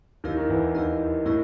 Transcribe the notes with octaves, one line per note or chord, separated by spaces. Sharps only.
D#2 D#3 E4 G4 A#4 D#5
D#3
E2 E3
D#2 D#3 E4 G4 A#4 D#5
A2 E4 G4 A#4 D#5